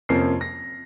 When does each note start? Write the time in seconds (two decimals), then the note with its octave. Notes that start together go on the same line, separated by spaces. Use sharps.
0.09 F2 C3 F3 A#3 C#4 C7
0.41 A#6